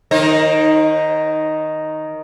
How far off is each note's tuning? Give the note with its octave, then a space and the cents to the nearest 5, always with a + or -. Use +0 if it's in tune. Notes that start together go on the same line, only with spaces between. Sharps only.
D#3 +0 D#4 +0 C5 +45